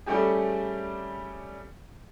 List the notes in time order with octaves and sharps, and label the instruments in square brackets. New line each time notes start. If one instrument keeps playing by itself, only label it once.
[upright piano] G3 A3 C#4 G4 G#4